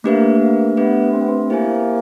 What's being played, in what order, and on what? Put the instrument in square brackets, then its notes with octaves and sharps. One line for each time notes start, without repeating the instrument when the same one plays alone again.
[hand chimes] A3 D4 G4 B4 E5 [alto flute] A#3
[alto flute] A#3
[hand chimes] A3 D4 G4 B4 E5 [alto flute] B3
[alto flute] C4
B3
C4
[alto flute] A#3 [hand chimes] E4 G4 C5 E5 G#5